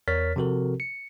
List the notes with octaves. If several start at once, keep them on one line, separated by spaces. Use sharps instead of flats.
E2 A#4 C#5 F6 A6 B6
C3 F3 C4 F#4 A4 A#4
C#7